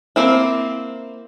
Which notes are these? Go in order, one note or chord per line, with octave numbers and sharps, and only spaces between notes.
A#3 C4 E4